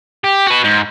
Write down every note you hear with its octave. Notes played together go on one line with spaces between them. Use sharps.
G4
F#4 B4
G#2